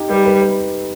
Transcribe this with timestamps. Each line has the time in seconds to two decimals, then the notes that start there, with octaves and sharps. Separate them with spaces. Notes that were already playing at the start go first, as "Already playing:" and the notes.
Already playing: D#4 G4
0.09 G3 B4
0.25 B4
0.41 B4